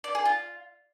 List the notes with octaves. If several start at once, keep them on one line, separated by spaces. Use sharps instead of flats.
D5
G#4
F4